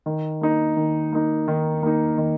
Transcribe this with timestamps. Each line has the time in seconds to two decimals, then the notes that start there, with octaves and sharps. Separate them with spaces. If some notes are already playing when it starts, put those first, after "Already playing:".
0.06 D#3
0.41 A#3 D#4
0.77 D#3
1.12 A#3 D#4
1.48 D#3
1.83 A#3 D#4
2.18 D#3